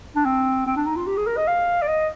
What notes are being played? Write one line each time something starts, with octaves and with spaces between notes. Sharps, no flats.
D4
C4
C4
D4
D#4
F4
G4
G#4
A#4
D#5
F5
D5
D#5